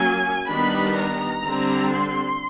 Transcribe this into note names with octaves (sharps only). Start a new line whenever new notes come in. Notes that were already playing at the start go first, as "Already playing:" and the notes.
Already playing: F#3 A#3 C#4 G#5
D#3 G3 B3 D4 B5
A#5
D3 G3 C4
C6